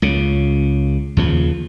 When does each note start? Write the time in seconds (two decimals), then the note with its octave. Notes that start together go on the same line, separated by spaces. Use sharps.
0.02 C#2 C#3
1.17 D#2 C#3 F3